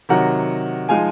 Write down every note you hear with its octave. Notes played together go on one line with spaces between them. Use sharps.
C3 D#3 F#3 F#5 A#5
F3 G#3 D#4 F5 G#5